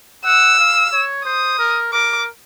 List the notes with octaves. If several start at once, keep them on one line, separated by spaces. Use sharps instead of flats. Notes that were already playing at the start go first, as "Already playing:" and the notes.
F#5 E6
F5
C#5
C5 D#6
A#4
A#4 D6